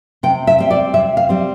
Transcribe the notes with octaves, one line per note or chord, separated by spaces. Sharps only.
C3 G5
E5
G3 C4
D5
C3 E5
F5
G3 C4